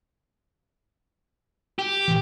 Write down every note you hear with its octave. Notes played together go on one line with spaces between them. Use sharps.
G4
A#2 E3